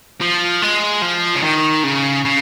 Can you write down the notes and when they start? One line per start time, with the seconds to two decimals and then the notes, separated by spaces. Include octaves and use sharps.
0.21 F3
0.62 G#3
1.02 F3
1.36 C#3
1.43 D#3
1.84 C#3
2.25 C#3